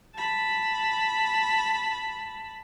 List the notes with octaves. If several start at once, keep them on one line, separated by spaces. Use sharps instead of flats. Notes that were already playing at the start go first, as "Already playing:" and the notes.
A5 B5